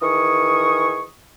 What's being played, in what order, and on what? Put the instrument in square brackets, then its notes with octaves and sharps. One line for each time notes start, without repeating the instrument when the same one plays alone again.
[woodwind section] D#3 E3 G#4 C#6 D#6